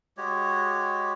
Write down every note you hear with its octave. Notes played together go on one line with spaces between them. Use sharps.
G#3 F#4 G4 C#5